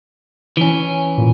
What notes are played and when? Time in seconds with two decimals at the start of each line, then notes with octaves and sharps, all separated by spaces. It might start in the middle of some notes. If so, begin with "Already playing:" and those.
0.57 E3 C#4
1.18 A#2